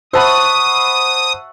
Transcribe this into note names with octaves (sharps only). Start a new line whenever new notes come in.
C5 E5 F#5 A5 B5 C#6 D#6